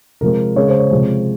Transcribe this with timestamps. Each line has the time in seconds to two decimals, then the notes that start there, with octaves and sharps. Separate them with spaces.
0.21 C3 F3 G#3 A#4
0.56 C#3 G#3 C#5
0.68 C5
0.79 C#5
0.91 C3 F3 G#3